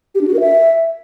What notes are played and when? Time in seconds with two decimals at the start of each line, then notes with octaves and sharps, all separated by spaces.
0.15 G4
0.21 D4
0.27 F#4
0.34 A#4
0.40 E5